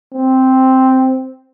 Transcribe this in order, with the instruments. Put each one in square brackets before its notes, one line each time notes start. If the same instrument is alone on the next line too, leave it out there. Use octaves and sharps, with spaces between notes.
[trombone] C4